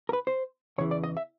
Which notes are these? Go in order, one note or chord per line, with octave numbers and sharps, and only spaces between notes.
A#4
B4
C5
E2 C#3 E3 C#5
D5
D#5
E5